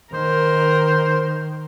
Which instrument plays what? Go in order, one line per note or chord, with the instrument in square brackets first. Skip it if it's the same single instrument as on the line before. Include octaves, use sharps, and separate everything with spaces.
[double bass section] D#3 [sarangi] A#4 [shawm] C5